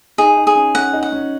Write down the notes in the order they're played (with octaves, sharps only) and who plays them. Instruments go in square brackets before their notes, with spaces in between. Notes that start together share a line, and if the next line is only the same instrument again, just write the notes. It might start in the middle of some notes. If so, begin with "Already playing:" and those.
[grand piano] D#4 [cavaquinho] G#4
[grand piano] D#4
[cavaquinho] G#4
[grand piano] C#4
[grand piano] C#4 [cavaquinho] F#5
[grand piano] D#4
[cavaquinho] F#5
[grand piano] C#4